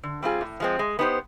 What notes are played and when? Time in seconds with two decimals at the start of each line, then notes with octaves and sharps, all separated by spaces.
0.03 D3
0.22 G3 C4 F4 G#4
0.41 A2
0.60 F3 G#3 C4
0.79 G#3
0.99 B3 D#4 G4 C5